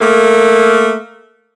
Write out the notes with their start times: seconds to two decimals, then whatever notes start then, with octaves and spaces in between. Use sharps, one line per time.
0.01 A3 A#3